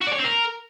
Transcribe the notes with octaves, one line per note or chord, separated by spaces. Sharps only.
F#4
D5
C#5
C4
A#4